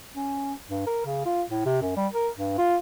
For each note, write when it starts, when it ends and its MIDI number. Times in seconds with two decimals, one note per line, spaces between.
0.16 0.53 61
0.69 0.84 43
0.87 1.01 70
1.06 1.24 49
1.25 1.43 65
1.50 1.63 45
1.65 1.81 48
1.82 1.95 42
1.97 2.07 55
2.13 2.29 70
2.37 2.55 43
2.58 2.76 65